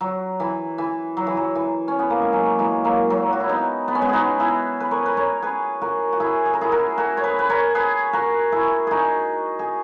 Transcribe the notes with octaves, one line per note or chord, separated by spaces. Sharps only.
F#3
E3
E3
F#3
E3
F#3
E3
C#4
B3
A#3
G#3
F#3
E3 G#3
F#3 A#3
F#3
F#4
E4
B3 D#4
B3
C#4
G#3 B3
D#4 F#4 G#4
E4 G#4
B4
A#4 C#5
B4
A#4 C#5
G#4 B4
F#4 A#4
F#4
E4 G#4
G#4
A#4
E4 G#4
F#4 A#4
F#4 A#4
C#5
G#4 B4
B4
A#4 C#5
G#4 B4
F#4 A#4
E4 G#4
D#4 F#4 G#4
G#4